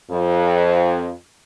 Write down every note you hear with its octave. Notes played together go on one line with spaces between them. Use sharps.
F2